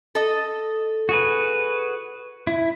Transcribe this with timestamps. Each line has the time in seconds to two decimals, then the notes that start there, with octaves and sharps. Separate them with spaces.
0.15 A4 D#5
1.09 F#4 G#4 B4
2.47 E4